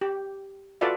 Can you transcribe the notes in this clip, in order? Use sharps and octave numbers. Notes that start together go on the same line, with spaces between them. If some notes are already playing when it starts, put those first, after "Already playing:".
G4
F4 F#4 A4 B4 D5 E5